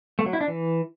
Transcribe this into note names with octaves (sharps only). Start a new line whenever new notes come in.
A3
F#3
E4
D4
E3